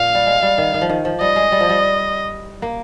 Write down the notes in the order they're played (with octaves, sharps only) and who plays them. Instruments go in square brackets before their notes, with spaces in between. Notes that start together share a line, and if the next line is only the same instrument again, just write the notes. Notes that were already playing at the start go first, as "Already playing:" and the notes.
Already playing: [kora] A#2 [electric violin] F5
[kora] G3
G#3
G3
D#3
D#3
F3
D#3
F3
[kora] G3 [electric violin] D#5
[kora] G#3
G3
F3
G3
A#3